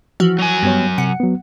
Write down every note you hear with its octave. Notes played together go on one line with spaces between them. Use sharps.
E3 F3 F#4
F#3 G#5
G2 G3 B3 C#5
C3 F#5 C#7
F#3 B3